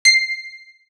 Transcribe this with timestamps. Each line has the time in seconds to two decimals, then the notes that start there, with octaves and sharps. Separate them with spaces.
0.05 C7